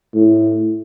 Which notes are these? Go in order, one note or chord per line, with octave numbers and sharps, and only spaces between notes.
A2